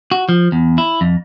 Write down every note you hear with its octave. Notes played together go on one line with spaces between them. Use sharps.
F#4
F3
E2
E4
F2